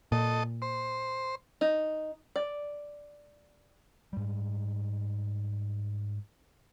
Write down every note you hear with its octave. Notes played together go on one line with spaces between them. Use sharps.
A#2 A4 D#5
C5
D#4
D5
G#2 G3